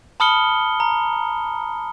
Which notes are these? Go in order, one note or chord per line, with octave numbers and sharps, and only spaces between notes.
A5 B5 D#6 F6 C#7 G7
A#5